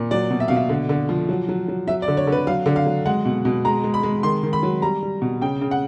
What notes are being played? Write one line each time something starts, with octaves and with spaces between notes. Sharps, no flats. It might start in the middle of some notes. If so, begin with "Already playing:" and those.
Already playing: A#2
F#3 D5
B2
E5
B2 F5
E5
D3
D3
F3
F#3
F#3
F#3
F#3 E5
D5
D3
C#5
D3
B4
F#3 F5
D3
F5
F#3
G#3 F#5
B2
B2
G#3 A#5
G#3
B5
G#3
D#3 C6
D#3
B5
F#3
G3 A#5
G3
B2
C#3 G5
C#3
F#5